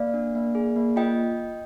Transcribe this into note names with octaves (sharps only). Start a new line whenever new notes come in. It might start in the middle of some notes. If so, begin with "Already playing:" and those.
Already playing: A#3 D5 F5
D4
A#3
G#4
A#3
F4 D#5 G5